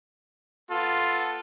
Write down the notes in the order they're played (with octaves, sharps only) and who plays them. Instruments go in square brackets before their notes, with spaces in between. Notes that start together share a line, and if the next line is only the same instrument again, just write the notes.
[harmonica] B3 A4 [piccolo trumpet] F4